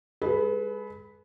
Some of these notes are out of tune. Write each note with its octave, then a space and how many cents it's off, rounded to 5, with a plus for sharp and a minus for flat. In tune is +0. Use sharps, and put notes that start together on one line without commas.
G#3 -40 G#4 +45 B4 +0